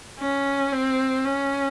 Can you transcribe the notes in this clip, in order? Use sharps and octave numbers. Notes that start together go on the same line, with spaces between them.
C#4
C4
C#4